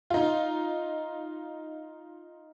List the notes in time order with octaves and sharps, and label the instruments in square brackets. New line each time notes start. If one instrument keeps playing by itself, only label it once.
[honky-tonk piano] D#4 F4